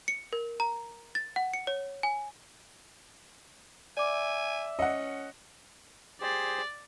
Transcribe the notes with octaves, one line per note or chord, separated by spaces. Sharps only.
C#7
A#4
A#5
A6
F#5
C#7
C#5
G#5
D5 E5 G#5 D6
C#4 D#5 F#5
G4 G#4 C5 D5